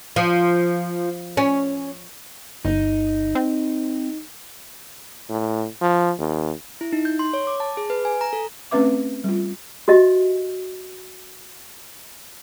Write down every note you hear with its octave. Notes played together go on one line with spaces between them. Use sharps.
F3
C#4
G1 D#4
C4
A2
F3
D#2
E4
D#4
G6
C6
C#5
D6
A5
G#4
B4
G#5
A#5
A4
A3 C4 C#4 B4 E5 D6
G3 F4
F#4 G4 D#5 E5